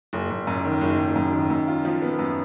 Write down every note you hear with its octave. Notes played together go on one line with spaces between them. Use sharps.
F#1
F#1
F#2
D#3
F#1
F#1
F#2
D#3
F#2
F4
F3
B3
F#2